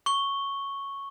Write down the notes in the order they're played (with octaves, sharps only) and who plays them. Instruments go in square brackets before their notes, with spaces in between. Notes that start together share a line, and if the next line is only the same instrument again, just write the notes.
[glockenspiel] C#6 G7